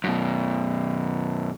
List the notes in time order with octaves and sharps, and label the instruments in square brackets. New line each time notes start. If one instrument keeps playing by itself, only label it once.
[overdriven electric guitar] F#2 B2